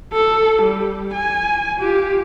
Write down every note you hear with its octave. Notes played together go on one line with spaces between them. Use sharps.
A4
G3
G#5
F4 G4